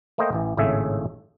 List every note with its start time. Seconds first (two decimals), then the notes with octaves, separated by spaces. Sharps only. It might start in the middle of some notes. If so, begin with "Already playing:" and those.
0.18 A3 A#3 C5 D#5 G5
0.33 A1 E3
0.57 G#1 A2 C#3 A3 G#4 E5